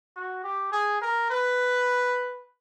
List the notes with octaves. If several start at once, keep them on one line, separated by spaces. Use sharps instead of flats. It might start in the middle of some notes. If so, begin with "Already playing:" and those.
F#4
G4
G#4
A#4
B4